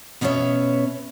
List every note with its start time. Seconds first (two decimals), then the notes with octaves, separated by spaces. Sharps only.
0.21 B2 B3 C#4 C5 C#5 E5